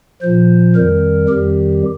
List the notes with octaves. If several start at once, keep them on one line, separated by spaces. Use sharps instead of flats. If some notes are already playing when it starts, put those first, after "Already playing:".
A#2 F3 C5
F2 D#3 G3 A#4
F2 D#3 G3 G4